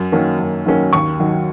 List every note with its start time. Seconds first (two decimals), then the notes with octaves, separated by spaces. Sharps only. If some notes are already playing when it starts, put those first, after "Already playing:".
Already playing: F#2
0.12 D#3 F#3 A#3 C#4
0.39 F#2
0.66 D#3 F#3 A#3 C#4
0.93 D#2 C#6
1.20 D#3 F#3